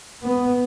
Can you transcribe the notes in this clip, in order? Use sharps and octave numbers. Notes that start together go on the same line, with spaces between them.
B3